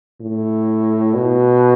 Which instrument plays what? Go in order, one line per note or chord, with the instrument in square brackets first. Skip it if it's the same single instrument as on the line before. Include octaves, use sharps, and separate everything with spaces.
[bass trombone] A2
B2